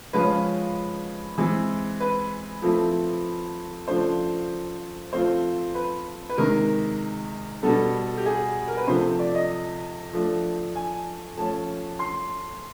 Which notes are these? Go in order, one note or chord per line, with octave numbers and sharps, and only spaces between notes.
C#3 F3 G#3 C#4 F4 B4
E3 G#3 C4
B4
F3 A3 C4 E4
C#3 F3 A3 D4 C5
F3 A3 C4 F4 C5
B4
B4
C3 D#3 G#3 A#4
B2 G3 B3 A4
G4
G#4
A#4
B4
C3 F3 A3 C5
D5
D#5
F3 A3 D4
G#5
F3 A3 C#4 A5
C6